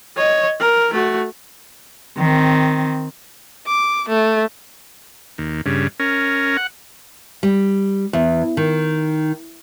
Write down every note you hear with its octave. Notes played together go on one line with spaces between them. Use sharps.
C#5 D#5
A#4
A3 F#4
D#3 C4
D6
A3
D#2
G2 C#3
C#4 A#4
F#5
G3
E2
D#3